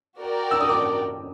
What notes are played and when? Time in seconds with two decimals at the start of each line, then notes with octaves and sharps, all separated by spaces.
0.21 F#4 A#4 D5 G5
0.51 E6
0.61 D#6
0.69 D6